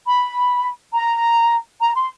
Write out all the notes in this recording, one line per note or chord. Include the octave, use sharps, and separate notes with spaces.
B5
A#5
A#5
C6